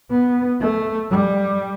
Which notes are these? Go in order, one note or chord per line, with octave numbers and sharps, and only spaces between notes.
B3
A3
G3